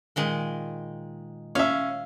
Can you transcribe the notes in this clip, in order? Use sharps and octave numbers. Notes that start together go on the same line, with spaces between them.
A#2 D#3 G#3
C#4 E5 F5